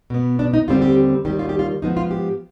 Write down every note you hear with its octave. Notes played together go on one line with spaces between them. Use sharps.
B2 B3
D4
D#4
D#2 D3 G3 C4 F4
G4
D#2 D#3 G3 G4
F4
G4
F4
G#2 F3 B3 D#4
F4
G4